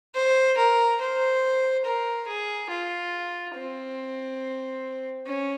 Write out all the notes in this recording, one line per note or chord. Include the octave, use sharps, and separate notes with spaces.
C5
A#4
C5
A#4
G#4
F4
C4
C#4